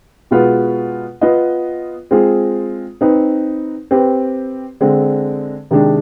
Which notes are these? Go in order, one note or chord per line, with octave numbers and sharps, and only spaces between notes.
B2 G#3 B3 F4 B4
B3 F4 B4 D#5
G#3 C4 F4 G#4
C4 D#4 B4
C4 G4 B4
D3 G#3 C4
C3 D#3 G#3 D4